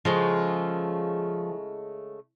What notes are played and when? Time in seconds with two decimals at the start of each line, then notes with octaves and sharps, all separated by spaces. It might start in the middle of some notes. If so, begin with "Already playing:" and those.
0.05 C#3 F3 G#3 A3